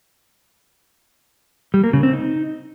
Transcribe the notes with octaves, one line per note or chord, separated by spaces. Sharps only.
G3
A#3
C#3
C4
D#4